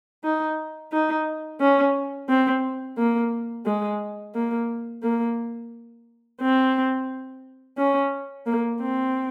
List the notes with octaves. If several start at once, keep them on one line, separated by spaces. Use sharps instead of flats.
D#4
D#4
C#4
C4
A#3
G#3
A#3
A#3
C4
C#4
A#3
C4